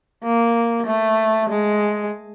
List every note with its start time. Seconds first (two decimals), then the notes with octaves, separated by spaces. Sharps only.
0.23 A#3
0.86 A3
1.49 G#3